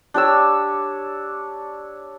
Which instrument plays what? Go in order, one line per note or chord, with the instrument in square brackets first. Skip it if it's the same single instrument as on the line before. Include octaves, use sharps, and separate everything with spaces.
[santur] D4 G4 C#5 E6